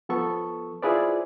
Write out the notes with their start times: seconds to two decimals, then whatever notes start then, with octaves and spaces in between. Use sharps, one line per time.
0.09 F3 B3 A4 C#6
0.82 E4 F4 G#4 B4 C5 D5